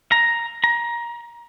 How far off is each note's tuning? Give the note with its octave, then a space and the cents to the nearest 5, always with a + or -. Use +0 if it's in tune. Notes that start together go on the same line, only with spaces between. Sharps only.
A#5 +5
A#5 +20